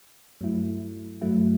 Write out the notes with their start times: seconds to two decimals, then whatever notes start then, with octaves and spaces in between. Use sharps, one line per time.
0.41 G2 F#3 A3 E4
1.21 G2 F#3 A3 E4